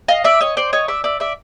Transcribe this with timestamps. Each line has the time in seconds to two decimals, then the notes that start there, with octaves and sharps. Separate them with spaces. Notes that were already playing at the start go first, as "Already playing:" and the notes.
0.08 D#5 F5
0.24 D5 E5
0.41 C#5 D#5
0.57 C5 D5
0.73 C#5 D#5
0.88 D5 E5
1.04 D5 E5
1.20 D5 E5